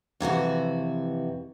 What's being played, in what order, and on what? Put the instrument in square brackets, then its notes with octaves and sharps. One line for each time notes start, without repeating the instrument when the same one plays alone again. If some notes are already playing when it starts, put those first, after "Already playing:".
[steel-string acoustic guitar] F2 C3 E3 F#4